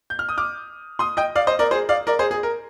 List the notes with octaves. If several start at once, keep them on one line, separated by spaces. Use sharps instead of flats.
G6
F6
D#6
D6 F6
C6 D#6
D#5 G5
D5 F5
C5 D#5
A#4 D5
G#4 C5
D5 F5
A#4 D5
G#4 C5
G#4
A#4